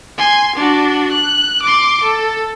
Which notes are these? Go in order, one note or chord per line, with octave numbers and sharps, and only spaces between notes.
G#5 C6
D4 F#4
F#6
C6 D6
A4